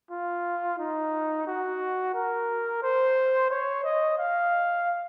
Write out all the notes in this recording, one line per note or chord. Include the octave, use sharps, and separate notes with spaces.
F4
D#4
F#4
A#4
C5
C#5
D#5
F5